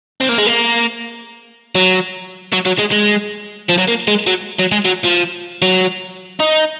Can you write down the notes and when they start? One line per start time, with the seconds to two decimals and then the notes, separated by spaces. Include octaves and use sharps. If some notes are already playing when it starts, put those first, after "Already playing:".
0.21 C4
0.29 A#3
0.38 G#3
0.46 A#3
1.75 F#3
2.53 F#3
2.66 F#3
2.78 G#3
2.91 G#3
3.69 F3
3.78 F#3
3.88 A#3
4.08 G#3
4.27 F#3
4.59 F#3
4.72 G#3
4.85 F#3
5.04 F3
5.62 F#3
6.39 D#4